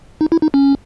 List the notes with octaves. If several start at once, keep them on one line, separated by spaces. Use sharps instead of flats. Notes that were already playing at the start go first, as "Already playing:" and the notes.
D#4
E4
D#4
C#4